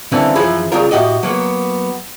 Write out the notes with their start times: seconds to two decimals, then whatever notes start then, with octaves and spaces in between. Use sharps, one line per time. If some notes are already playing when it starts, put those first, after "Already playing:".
0.12 D3 E3 G3 A#3 C4 C#4
0.35 F#2 E3 F3 F4 G#4 B5
0.72 C#2 C#3 G3 F4 A#4
0.91 A2 F#4 G4 D#5
1.23 F#3 A#3 B3